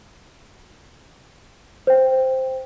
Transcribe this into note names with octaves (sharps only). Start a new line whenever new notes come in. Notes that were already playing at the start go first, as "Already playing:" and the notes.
C5 G5